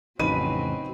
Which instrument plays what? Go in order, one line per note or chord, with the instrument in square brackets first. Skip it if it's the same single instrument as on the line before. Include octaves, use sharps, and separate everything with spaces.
[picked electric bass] A1 F2 C#3 [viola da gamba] F#3 C4 [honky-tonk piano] D#4 D#7 [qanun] B4